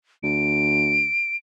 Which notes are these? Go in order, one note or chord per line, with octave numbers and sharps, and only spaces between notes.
D2 D7